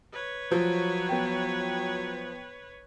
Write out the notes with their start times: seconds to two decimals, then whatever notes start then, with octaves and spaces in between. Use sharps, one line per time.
0.12 B4 C#5
0.52 F3 F#3
1.09 B3 G5